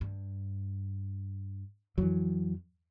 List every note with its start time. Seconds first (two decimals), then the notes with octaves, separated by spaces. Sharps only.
0.01 G2
1.98 F2 E3 F#3